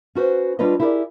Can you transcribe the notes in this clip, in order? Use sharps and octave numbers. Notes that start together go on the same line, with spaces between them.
C#4 F#4 B4 C5
G3 D4 F4 B4 C#5 D#5
E4 G4 G#4 A#4 C5 D5